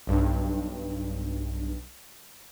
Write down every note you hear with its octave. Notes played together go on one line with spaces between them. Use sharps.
B1 G2